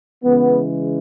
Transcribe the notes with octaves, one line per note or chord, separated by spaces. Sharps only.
C#3 E3 G#3 B3